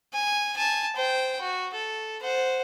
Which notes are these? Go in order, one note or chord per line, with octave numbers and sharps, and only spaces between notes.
G#5
G#5 A5
C5 G5
F#4
A4
C5 F#5